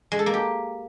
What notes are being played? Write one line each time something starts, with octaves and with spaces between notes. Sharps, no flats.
G#3
A4
A#3
G4